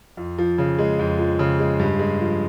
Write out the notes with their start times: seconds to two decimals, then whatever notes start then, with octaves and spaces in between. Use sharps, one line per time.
0.17 F2
0.38 F3
0.58 C#3
0.78 G#3
0.99 F2
1.19 F3
1.39 C#3
1.60 G#3
1.80 G2
1.99 G#3
2.20 F3